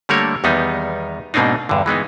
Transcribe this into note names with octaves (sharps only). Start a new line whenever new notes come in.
D3 G3 A3 A#3 A#4 C#5
E2 D#3 G3 B3 D#4
G#2 B2 A#3 C4 D4 D#4
E2 G2 D3
E3 G#3 B3 D#4